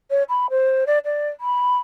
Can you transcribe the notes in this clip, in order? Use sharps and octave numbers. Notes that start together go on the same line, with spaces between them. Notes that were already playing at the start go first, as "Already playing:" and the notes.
C#5
B5
C5
D5
D5
B5